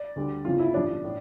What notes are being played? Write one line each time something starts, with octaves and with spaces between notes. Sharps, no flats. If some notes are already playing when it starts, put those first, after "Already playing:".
Already playing: D5
D2 D3 G3
G1 F2 C#3 F3 F4
E4
A1 G2 F3 D4
A2